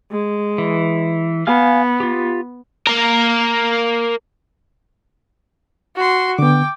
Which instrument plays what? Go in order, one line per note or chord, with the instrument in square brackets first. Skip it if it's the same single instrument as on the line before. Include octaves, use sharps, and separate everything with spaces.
[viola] G#3
[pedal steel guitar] E3
[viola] B3 [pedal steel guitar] F5 G#5 F6
[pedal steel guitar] F4 G4
[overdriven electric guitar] A#3 A#4
[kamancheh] F#4 C6
[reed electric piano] D3 B3 [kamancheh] G5 D6